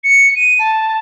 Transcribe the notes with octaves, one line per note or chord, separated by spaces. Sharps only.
C#7
D#7
A5